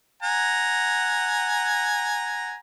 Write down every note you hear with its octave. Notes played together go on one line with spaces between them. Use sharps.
F#5 G#5 A#5